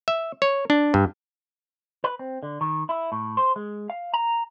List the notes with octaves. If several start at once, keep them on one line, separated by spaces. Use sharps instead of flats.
E5
C#5
D4
G2
B4
C4
D3
D#3
E4
A2
C5
G#3
F5
A#5